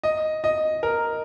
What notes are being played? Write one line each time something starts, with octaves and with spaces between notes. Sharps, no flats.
D#5
D#5
A#4